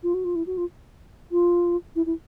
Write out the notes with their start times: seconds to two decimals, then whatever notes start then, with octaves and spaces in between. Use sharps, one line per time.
0.03 F4
0.14 F#4
0.24 F4
0.35 E4
0.47 F#4
0.57 F4
1.32 F4
1.96 E4
2.06 E4